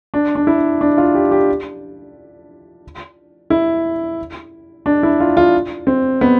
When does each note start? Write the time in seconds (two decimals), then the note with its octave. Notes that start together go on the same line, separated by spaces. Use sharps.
0.14 D4
0.35 D4
0.47 E4
0.81 D4
0.98 F4
1.15 G4
1.31 G4
3.50 E4
4.86 D4
5.03 E4
5.20 F4
5.37 F4
5.87 C4
6.21 B3